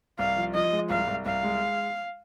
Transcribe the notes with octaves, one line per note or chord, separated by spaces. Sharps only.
C2 F5
F3
F3 D#5
G#3
C2 F5
C2
C2 F5
G#3